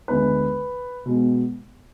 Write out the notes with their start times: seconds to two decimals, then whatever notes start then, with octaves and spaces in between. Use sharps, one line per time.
0.08 D2 D3 G#3 B3 B4
1.06 B2 G#3 B3